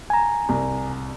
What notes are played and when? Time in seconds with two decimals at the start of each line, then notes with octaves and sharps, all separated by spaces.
0.10 G#5 A#5
0.49 C2